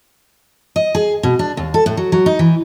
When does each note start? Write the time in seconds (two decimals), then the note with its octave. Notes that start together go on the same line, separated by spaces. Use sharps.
0.76 D#5
0.95 G#4
1.23 B2
1.39 D4
1.57 D#2
1.74 A4
1.86 A2
1.97 F#3
2.12 F#3
2.26 D#4
2.39 E3